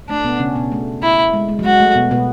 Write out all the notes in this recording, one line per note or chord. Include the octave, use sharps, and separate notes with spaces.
A3 D4
B2 B3
C#3 C#4
B2 B3
A3
E4
G#3
G#3
F#3
G#3 F#4
A3
B2 B3
B2 B3